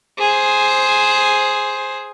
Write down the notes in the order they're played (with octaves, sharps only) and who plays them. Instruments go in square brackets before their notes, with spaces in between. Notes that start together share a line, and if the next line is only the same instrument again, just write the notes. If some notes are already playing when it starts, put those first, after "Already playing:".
[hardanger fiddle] G#4 C5